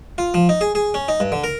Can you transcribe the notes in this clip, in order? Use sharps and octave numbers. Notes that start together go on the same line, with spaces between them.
F4
F3
D#4
G#4
G#4
C#4
D#4
G2
D3
A#4